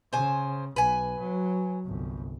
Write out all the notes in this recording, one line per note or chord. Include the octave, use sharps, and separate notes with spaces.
C#3 C5 G#5
B1 B4 G#5
F#3
G1 C2